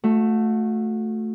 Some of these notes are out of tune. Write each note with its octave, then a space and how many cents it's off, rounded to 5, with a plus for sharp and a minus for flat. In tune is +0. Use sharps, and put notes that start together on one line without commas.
A3 +0 F#4 -30